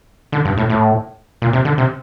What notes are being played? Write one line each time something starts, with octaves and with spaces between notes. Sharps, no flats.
D3
G2
A2
A2
A#2
C3
D3
C3